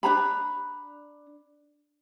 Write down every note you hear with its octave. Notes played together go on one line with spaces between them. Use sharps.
D4 C5 A#5 B5